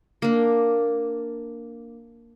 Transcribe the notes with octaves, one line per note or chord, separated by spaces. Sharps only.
A#3 D4